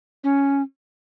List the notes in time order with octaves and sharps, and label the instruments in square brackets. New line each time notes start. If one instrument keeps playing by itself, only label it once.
[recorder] C#4